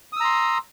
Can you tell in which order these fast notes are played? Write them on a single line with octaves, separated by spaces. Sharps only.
D#6 E6 A#5 C6